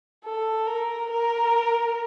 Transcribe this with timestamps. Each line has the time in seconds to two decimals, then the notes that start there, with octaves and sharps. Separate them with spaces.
0.25 A4
0.67 A#4
1.10 A#4